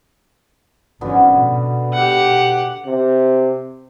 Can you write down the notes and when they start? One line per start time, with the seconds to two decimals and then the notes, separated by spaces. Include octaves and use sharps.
1.01 G#1 D3 F3 B3 C#4 F#4
1.31 B2
1.94 G4 F#5
2.86 C3